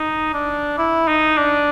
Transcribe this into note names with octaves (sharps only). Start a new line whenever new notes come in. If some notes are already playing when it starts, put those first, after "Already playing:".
Already playing: D#4
D4
E4
D#4
D4